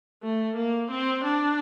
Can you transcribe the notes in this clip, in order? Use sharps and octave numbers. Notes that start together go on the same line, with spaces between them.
A3
A#3
C4
D4